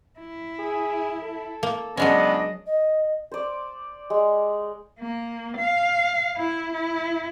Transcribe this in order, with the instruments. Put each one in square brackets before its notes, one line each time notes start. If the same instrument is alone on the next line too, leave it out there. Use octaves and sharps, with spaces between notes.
[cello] E4
[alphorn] G#4
A4
[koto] A#3
[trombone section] C#2 B3 D4 [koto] F#3 G#3 C#4 [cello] D#5
[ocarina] D#5
[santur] C5 D5
G#3
[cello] A#3
F5
E4
E4